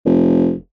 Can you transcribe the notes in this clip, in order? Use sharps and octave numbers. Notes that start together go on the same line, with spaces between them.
F1